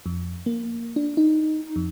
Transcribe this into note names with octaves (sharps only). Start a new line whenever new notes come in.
F2
A#3
D4
D#4
F2